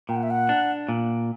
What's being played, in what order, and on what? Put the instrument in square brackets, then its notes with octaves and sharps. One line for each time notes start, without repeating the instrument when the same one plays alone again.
[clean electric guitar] A#2 [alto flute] G5
[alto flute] F#5
E5
F#5
[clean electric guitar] D4
A#2